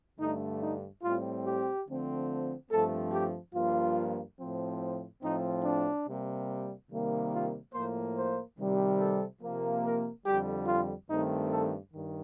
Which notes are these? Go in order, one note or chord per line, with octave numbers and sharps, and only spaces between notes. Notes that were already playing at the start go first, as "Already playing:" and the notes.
G2 D3 A3 D#4
D#4
A2 G3 C4 F4
G4
D3 F3 A3 C4
G2 F3 A3 C4 A4
G4
G2 F3 A#3 F4
A2 F3 C4
A2 F3 C4 D#4
D4
C3 G3 A#3
C3 D#3 G3 A#3
F4
A2 F3 A#3 C5
C5
C3 D#3 G3 C4
A4
C3 F3 A#3
A#4
F2 D3 G3 G4
F4
G2 D#3 A3 C4 D#4
A4
G2 D#3